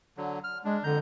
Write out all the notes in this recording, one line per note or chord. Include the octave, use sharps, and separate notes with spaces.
D3 F#3
F6
G#3 D4
F2 D3 A#5 G6